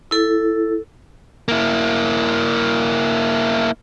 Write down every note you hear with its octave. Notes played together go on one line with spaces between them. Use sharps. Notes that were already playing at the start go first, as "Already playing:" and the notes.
E4 A4
A#3 E4